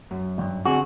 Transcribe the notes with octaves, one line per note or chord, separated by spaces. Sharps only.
F#2
D2 G2
D3 C4 F#4 G#4